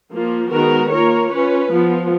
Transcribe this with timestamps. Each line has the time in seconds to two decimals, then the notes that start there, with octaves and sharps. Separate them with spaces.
0.13 F3 A#3 F4
0.51 D#3 G#3 B3 F#4 A#4
0.92 A#3 F4 A#4 C#5
1.31 C#4 F4 B4
1.70 F3 B3 F4